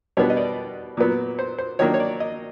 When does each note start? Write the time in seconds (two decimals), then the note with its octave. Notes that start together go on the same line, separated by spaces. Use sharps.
0.17 B2 G3 B3 D4 C#5
0.30 D#5
0.37 D5
0.97 A#2 F#3 B3
1.39 C5
1.59 C5
1.79 D#3 F#3 A#3 D4 C#5
1.94 C#5
2.00 D5
2.20 D#5